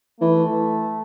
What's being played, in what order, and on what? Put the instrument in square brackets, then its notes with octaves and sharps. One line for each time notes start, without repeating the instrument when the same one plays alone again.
[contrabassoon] E3 [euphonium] A3